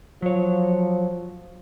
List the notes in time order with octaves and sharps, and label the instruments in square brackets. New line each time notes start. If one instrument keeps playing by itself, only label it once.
[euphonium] F3 [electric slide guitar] F#3 C#5